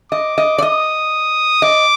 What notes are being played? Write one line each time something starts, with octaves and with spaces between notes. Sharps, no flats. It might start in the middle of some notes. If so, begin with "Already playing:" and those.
D#5 D6
D#5
D5
D#5 D#6
D#5 D6